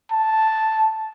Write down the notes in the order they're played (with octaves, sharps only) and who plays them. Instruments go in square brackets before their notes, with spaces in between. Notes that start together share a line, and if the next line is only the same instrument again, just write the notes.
[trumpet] A5